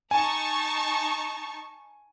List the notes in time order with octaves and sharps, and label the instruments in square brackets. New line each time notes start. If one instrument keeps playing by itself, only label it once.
[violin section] D#4 A5 C#6 [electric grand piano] G#5